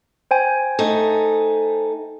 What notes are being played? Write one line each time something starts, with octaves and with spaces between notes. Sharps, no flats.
C5 G5 G#5
A3 D#4